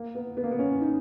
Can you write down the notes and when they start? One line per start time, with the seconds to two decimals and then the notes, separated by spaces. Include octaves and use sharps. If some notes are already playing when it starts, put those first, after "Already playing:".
Already playing: A#3
0.15 B3
0.37 B3
0.43 A#3
0.51 B3
0.59 C#4
0.81 D#4